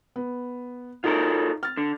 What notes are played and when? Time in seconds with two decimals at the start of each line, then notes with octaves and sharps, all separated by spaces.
0.16 B3
1.04 D#4 F4 A4 A#4
1.63 F6 A6
1.77 D3